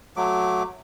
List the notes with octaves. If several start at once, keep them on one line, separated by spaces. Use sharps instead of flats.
F#3 A3 D6